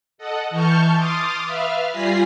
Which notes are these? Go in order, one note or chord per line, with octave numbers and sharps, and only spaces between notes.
A4 D#5 F#5
E3 A5 C#6 F6 G6
C6 D6 D#6 F6 A6
B4 E5 F5 F6
G3 F4 G#5 B5 A#6 C7